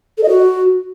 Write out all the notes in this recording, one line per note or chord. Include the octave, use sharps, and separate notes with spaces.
A4
D#5
F#4